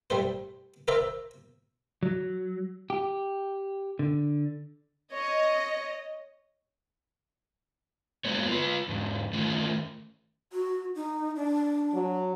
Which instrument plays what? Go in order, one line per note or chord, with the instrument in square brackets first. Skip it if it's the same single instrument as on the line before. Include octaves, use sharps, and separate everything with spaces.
[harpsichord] G3 A3 C5
A#4 C5 D5 E5
[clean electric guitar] F#3
G4
D3
[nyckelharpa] C#5 [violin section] D#5
[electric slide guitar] F#3 G#3 A#3 B3 C#5
F4 B4
E2 G#2
D#3 A3 C#4 F4
[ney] F#4
D#4
D4
[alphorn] F#3